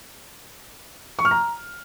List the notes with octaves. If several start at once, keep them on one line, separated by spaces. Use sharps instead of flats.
C#6
F6
A#5